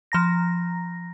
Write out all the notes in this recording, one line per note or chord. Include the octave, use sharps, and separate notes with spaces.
F3 A#5 A#6